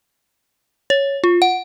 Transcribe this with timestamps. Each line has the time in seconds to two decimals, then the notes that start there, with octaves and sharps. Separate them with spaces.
0.90 C#5
1.24 F4
1.42 F#5